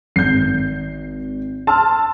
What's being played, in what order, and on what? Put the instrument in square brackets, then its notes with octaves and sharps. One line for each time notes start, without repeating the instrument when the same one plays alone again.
[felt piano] G#1 [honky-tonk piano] G6 C7
[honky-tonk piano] A5 [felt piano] C6 E6 F6